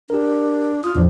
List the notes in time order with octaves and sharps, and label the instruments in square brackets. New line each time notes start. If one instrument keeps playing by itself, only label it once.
[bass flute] D4 [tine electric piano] G4 A#4
[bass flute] F4 [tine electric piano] D#6 F6
[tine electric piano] E2 A2 F3 [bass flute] D4